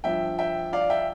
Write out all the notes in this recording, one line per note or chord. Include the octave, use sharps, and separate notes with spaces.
G2 F3 E5 G5
E5 G5
D5 F5
E5 G5